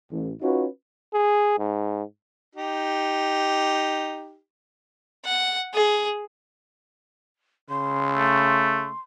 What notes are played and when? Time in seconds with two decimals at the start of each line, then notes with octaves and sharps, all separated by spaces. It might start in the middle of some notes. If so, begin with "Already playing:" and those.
0.11 A1
0.42 C#4 D#4 F4 F#4 B4
1.14 G#4
1.58 G#2
2.56 D#4 G4
5.25 F#5
5.74 G#4
7.70 C#3 C6
8.15 A3